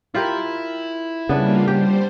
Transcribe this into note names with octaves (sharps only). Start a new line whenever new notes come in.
E4 F4 G4 A#4
C#3 G3 A#3 B3 D4 F4 B4
G3 G4 C5